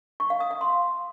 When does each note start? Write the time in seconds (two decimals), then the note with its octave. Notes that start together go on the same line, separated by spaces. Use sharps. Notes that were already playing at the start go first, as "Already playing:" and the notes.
0.20 C#6
0.30 F5
0.40 D#6
0.51 F5
0.61 C6